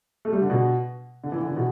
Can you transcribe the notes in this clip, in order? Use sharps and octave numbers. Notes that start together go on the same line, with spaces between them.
A3
G3
D3
B2
D3
E3
D3
E3
B2